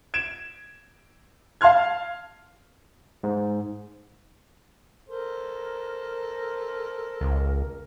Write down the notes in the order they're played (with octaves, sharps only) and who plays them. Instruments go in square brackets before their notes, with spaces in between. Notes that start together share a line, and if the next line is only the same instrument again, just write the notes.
[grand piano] G#6 D7 E7
F5 A5 C6 F6 G#6
[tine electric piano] G#2
[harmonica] A4 C5 [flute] A#4
[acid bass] C#2